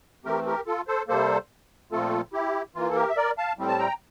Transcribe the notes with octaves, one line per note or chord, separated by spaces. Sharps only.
E3 A3 C4 G4 A#4
G4 A#4
F4 A4
A4 C5
C3 G3 A#3 A4 C5
A#2 F3 A3 C4 F4 A4
E4 G4
E3 A#3 F4
A4
G4 A#4
E5
A#4 D5
F5 A5
A2 G3 C4
A5
G5 A#5